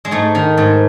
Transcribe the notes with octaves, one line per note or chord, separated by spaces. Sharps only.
G#3
G#2 A3
D#3
G#2